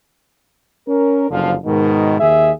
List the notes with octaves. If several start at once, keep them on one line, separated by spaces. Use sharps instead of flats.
C#4 A#4
F#1 F2 D3 F3 F5
G#2 B2 D#3
D#2 G#4 E5